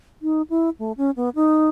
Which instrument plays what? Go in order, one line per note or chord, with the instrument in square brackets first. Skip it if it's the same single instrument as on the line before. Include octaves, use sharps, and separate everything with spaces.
[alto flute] D#4
E4
A3
C#4
B3
D#4